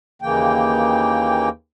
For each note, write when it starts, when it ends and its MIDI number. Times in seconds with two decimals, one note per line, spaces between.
0.22 1.49 39
0.22 1.49 49
0.22 1.49 52
0.22 1.49 58
0.22 1.49 79